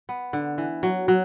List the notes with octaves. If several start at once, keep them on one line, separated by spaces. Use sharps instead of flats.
B3
D3
E3
F#3
F#3